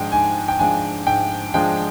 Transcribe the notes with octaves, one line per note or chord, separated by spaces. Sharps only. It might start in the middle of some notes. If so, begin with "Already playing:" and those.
Already playing: G#2 F3 G#3 D4 G5
G#2 G#5
G5
F3 G#3 D4 G#5
G#2 G5
F3 G#3 D4 G5